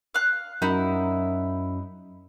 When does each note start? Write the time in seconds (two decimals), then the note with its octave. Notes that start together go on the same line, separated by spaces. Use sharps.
0.14 F5 F#6
0.62 F#2 D#4 E4